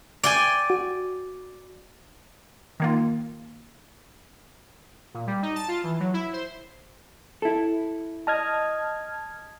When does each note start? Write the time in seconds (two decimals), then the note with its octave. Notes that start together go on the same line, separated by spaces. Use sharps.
0.24 D5 G5 G#5
0.70 F#4
2.80 D#3 A#3 F4
5.14 A#2
5.27 G3
5.42 D#4
5.56 A5
5.68 F4
5.83 E3
6.00 F#3
6.13 E4
6.33 C5
7.42 E4 A4
8.27 D#5 A5 F6 G#6